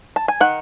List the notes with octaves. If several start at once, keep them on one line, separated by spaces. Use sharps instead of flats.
A5
G#5
D#3 F#5